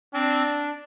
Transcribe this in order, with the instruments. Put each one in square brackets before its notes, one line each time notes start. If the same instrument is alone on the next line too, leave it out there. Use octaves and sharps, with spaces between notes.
[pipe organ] C4 [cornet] D4